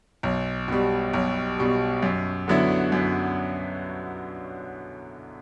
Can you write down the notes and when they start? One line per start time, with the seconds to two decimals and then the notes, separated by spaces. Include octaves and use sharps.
0.23 B1
0.68 B2 G3
1.13 B1
1.59 B2 G3
2.02 F#2
2.48 D3 F#3 B3 E4
2.92 F#2